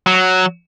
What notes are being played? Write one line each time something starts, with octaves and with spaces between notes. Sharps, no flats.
F#3